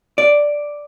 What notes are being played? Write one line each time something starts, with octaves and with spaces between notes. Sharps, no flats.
D5